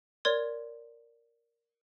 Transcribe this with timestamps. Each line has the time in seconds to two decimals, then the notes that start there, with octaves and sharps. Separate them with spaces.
0.25 A#4 C#5 D5 C6 G#6